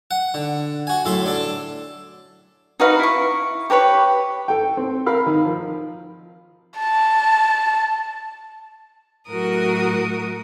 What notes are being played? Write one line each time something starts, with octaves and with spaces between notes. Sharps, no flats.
F#5
D3
F#4 G#5
F#2 A2 A4 B5 C6
D4 A4
D#4 F#4 B4 F5
E4 C#6
G4 A#4 B4 C#5
A4 G5
C4
A#4 F5 B5
D#3
F3
A5
A2 F#3 F#4 A#4 D#6